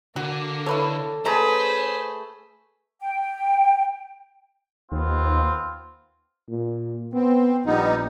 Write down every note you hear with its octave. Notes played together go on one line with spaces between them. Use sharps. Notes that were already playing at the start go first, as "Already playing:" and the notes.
D3 A#3 F#4
E4 A4 B4 C#5
A3 C#4 G#4 B4 C5 A5 A#5
G5
D#2 B3 C4 F4
A#2
B3 C4
A#1 G3 B3 D#4